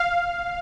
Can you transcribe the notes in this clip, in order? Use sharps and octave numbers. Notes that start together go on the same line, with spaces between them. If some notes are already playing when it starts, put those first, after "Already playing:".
Already playing: F5